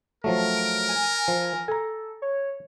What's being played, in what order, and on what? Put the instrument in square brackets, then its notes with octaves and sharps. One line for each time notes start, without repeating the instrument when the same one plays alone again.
[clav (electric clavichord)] F3 F#3 A3 [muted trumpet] A#4
[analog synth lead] D7
G#5
[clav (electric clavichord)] F3
[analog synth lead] A4 [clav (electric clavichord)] G#5 A#5
[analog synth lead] C#5